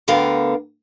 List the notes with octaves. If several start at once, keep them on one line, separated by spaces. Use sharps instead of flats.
D2 D3 B3 A#4 F5 G5